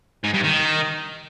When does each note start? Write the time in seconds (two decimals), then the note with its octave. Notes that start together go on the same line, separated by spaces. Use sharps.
0.24 G#2
0.34 G2
0.44 D#3